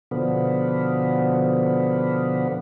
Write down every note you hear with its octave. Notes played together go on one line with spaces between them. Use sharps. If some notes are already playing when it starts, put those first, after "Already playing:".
B2 D3 F3 B3